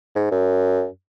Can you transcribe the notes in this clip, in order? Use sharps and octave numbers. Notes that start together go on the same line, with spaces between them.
G#2
F#2